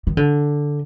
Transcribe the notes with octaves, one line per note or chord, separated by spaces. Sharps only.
D#3
D3